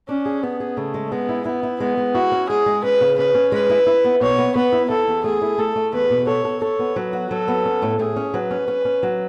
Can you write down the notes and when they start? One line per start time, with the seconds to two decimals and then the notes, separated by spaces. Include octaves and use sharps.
0.09 C#4 D4
0.26 G#4
0.43 B3 G#4
0.60 G#4
0.77 C#3 A3
0.94 G#3
1.11 G#3 B3
1.29 E4
1.45 B3 E4
1.63 E4
1.80 G#3 B3
1.97 G#3
2.15 E4 F#4
2.32 C#4
2.49 G#3 G#4
2.66 G#3
2.84 C#4 B4
3.01 C#3
3.18 C#4 B4
3.35 C#4
3.52 G#3 B4
3.70 E4
3.87 E4
4.04 B3
4.21 B2 C#5
4.38 B3
4.56 B3 B4
4.73 E4
4.90 E4 A4
5.08 E2
5.24 A3 G#4
5.42 E4
5.58 A3 A4
5.76 A3
5.93 E2 B4
6.10 B2
6.27 A4 C#5
6.45 A4
6.62 A4 C#5
6.79 B3
6.96 F#3 B4
7.13 F#4
7.31 F#3 A4
7.48 B3
7.65 C#4
7.82 A2
7.99 A2 G#4
8.16 C#4
8.34 F#3 B4
8.51 C#4
8.68 C#4
8.85 C#4
9.03 F#3